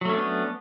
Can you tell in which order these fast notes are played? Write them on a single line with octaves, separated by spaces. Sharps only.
F#3 A3 C#4 D4 B3